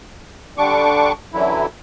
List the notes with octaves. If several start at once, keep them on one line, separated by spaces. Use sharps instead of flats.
D3 G3 D4 C#6 D6
F#2 D3 E3 F#3 E4